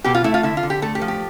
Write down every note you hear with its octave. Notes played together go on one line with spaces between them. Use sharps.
B2 G4
F4
A3 E4
F4
D3 E4
F4
D3
G4
A3 A4
G4
F3
G4